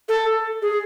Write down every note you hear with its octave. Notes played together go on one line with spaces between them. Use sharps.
A4
G#4